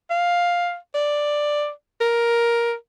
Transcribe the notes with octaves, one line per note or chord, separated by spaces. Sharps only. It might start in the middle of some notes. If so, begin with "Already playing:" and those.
F5
D5
A#4